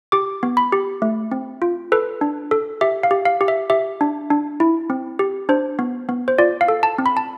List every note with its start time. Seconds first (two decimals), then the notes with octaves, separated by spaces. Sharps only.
0.12 G4 D6
0.43 B3
0.57 B5
0.72 G4
1.02 A3
1.32 C4
1.62 F4
1.92 A4 B4
2.21 D4
2.51 A4
2.81 G4 E5
3.03 F5
3.11 G4
3.25 F5
3.41 G4
3.48 E5
3.70 G4 E5
4.01 D4
4.30 D4
4.60 E4
4.90 C4
5.19 G4
5.49 D4 C5
5.79 B3
6.09 B3
6.28 C5
6.38 F4 D5
6.61 F5
6.68 A4
6.83 A5
6.98 C4
7.06 B5
7.17 A5